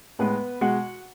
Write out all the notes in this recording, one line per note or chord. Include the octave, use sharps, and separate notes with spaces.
A2 G#3 B3 B4
B2 G#3 F#4 F#5